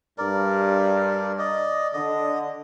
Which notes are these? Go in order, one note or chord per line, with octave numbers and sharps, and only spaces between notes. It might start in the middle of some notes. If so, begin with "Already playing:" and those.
G2 A#4 D5
D5 D#5
D3 D#5